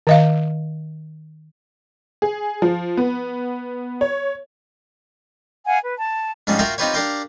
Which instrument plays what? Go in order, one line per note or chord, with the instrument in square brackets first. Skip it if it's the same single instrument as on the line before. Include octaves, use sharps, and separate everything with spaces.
[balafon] D#3 D#5 F5
[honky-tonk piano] G#4
F3
B3
C#5
[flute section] F5 F#5 G#5
B4
A5
[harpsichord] G#2 F3 G3 C4 C#4
F4 F#4 A#4 E5 F5 G5
C4 D#4 F4 G4 B4 C#5
D4 G4 A#4 F5 G5